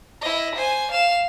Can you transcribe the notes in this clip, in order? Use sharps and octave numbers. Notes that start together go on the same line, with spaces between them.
E4 D#5
C5 G#5
F5 E7